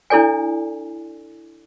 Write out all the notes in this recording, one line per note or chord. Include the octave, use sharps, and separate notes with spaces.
D4 E4 A4 D5 G#5